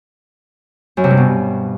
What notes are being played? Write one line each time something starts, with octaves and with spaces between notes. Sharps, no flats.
F#2
C3
G2
B2